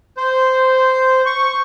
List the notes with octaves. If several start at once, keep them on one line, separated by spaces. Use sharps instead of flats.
C5
C#6